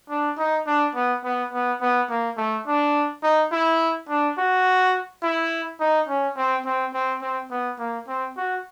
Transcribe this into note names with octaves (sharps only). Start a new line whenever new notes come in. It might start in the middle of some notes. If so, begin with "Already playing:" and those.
D4
D#4
D4
B3
B3
B3
B3
A#3
A3
D4
D#4
E4
D4
F#4
E4
D#4
C#4
C4
C4
C4
C4
B3
A#3
C4
F#4